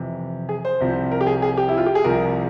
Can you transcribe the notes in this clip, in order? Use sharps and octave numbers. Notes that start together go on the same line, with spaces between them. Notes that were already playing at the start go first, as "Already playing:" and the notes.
Already playing: F2 C3 E3
G#4
C5
C2 C3 F3
A#4
G4
G#4
G#4
G4
E4
F4
G4
G#4
C2 C3 F3 A#4